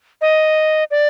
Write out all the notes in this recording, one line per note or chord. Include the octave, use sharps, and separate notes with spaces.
D#5
D5